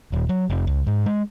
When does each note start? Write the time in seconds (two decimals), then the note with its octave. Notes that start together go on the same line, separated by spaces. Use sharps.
0.12 D#1
0.29 F#3
0.49 F1
0.67 C#2
0.87 G#2
1.06 G#3